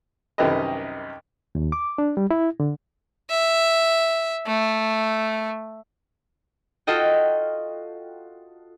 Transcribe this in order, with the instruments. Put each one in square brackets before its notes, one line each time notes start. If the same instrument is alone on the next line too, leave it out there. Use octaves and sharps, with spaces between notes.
[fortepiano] C2 F#2 D#3 G4 B4 D#5
[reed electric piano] D#2
D6
D4
G3
E4
D3
[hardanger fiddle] E5
A3
[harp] F4 F#4 A4 D#5 G5